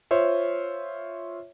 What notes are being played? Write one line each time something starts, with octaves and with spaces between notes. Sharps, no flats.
F4 C5 C#5 E5